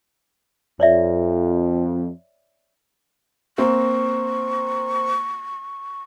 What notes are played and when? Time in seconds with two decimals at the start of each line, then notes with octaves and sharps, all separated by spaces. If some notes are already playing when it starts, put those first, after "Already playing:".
0.80 F2 C#5 D5 E5
3.58 A#3 C4 C#6